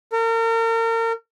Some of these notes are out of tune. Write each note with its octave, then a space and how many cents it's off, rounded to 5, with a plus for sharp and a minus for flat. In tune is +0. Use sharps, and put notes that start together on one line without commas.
A#4 -35